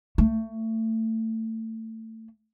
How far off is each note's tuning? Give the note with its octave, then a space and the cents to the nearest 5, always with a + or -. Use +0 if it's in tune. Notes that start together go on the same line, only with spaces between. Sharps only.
A3 +25